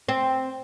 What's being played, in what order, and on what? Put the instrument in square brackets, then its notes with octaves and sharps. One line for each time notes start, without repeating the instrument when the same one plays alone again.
[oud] C4